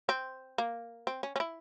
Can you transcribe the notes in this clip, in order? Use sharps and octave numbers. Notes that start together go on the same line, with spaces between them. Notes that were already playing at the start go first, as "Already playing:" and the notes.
C4
A#3
C4
C#4
C#4
E4